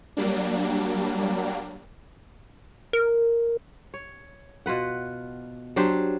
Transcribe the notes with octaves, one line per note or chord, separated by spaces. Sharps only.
F#3 G3 A#3 D4
A#4
C#5
B2 F4 B4 F#5
F#3 D4 G4 C5